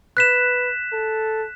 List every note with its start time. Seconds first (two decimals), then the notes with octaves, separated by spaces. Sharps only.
0.17 B4 F#6 B6 E7
0.92 A4